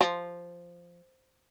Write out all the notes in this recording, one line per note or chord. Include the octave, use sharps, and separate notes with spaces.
F3